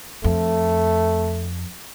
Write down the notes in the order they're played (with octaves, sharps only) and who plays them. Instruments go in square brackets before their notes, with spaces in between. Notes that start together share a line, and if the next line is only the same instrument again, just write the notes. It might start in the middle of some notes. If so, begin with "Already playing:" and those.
[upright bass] F2 [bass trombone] A3